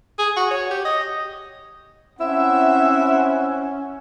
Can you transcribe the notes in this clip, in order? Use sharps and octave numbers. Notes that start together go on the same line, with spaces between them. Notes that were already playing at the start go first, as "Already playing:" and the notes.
G#4
F#4
C#5
G4
D#5
C4 C#4 E4 E5 F#5